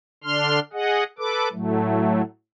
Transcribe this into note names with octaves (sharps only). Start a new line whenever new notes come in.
D3 D4 C6 F6
G#4 D#5 F#5
A4 B4 D6
A2 F#3 A3